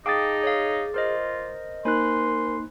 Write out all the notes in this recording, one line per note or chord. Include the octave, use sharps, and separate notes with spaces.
D#4 G#4 F5 G5 A5 D6 D#6 A6
C#5 F5
F4 A#4 C5 D#5
A#3 D#4 A#4 C5 G#5 B5 C6 F#6